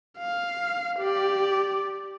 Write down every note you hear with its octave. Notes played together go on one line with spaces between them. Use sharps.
F5
G4 D5